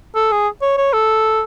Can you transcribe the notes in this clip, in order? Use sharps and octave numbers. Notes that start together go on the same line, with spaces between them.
A4
G#4
C#5
C#5
A4